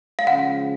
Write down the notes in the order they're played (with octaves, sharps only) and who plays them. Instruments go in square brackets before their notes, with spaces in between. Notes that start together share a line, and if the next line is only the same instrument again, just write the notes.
[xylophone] F5
[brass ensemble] C#3 F3 G#3 C#4 [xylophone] F#5